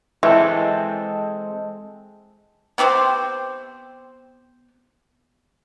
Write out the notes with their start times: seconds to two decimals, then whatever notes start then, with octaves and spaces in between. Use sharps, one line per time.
0.23 E3 G#3 C4 A4
2.78 B3 C4 G4 C5